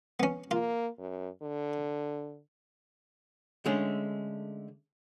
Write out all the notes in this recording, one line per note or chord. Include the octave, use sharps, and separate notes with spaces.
B3 C#4
A#3 F4
F#2
D3
D3 G#3 A3 C#4